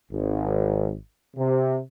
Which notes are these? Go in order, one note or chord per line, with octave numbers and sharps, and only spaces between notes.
G#1
C3